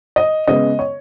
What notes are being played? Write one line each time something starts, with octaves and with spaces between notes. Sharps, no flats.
D#5
C#3 G#3 B3 D#5
C#5